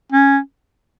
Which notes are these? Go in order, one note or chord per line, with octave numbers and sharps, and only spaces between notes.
C#4